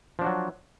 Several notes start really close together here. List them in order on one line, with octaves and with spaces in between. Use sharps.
F3 D4 F#4 F#3